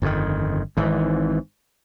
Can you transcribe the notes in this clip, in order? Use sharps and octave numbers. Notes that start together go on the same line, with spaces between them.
G1 F2 C3 D#3
G#1 G#2 E3